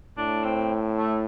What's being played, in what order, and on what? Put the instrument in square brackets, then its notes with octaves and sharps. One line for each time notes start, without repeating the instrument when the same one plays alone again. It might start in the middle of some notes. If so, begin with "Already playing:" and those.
[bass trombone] A2 [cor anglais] D4
[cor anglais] C4
A3